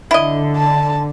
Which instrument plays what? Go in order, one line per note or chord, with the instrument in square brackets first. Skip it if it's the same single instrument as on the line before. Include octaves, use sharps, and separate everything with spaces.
[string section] D3 [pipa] E4 D#5
[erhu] A5